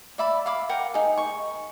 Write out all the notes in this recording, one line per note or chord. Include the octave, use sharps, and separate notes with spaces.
D5 E5 B5
F5 B5 D6
A#4 F#5 G5
D#4 G#4
C#6